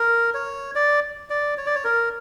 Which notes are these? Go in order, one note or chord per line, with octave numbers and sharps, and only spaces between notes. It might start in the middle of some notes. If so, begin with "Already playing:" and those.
Already playing: A#4
C#5
D5
D5
C#5
D5
C#5
A#4